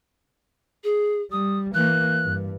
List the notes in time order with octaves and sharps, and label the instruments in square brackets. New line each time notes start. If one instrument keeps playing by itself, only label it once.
[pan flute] G#4
[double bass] G3 [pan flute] D#6
[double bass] E3 A#3 [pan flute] F#6
[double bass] G2